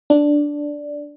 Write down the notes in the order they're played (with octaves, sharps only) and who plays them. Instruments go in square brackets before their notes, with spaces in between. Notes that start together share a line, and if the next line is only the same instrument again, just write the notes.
[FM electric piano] D4